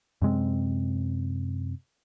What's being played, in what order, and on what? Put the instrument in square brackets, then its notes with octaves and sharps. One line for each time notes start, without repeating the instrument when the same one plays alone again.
[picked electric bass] F#2 C3 G#3 C4